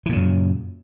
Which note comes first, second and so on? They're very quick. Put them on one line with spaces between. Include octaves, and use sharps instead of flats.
E3 A#2 C#3 F#2